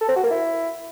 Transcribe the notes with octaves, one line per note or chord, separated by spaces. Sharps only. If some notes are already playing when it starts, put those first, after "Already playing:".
A4
C4
F#4
A#3
E4